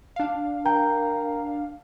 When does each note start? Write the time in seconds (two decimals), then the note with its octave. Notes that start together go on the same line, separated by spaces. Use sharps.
0.16 D4 F5
0.66 A#4 G5 A#5